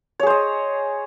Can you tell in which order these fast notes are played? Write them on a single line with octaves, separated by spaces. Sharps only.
C#5 G#4 C5 D#5